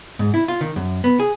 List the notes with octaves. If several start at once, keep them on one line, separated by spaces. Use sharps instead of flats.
G#2
E4
F4
D#3
F#2
B3
G#4